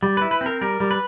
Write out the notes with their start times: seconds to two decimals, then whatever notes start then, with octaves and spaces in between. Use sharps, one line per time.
0.03 G3
0.17 E4 B4
0.31 B4
0.41 C4
0.46 A#4
0.61 G3 A#4
0.80 G3
0.91 B4